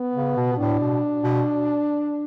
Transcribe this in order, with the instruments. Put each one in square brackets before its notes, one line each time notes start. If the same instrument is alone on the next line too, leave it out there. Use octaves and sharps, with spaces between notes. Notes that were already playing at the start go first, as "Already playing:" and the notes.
Already playing: [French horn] B3
[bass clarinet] C#3
B2
B2
[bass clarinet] A2 [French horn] D4
[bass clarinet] B2
B2